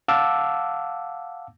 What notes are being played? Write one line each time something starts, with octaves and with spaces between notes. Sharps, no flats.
F5 F#5 A5 D6 E6